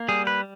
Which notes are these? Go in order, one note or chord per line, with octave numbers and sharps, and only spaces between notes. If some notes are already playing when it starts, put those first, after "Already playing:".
Already playing: A#3
G3 G#4
B4